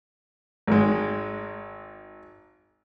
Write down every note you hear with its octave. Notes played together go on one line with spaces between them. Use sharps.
G#1 G#3